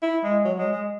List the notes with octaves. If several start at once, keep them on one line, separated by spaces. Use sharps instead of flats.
E4
G#3
F#3
G#3
G#3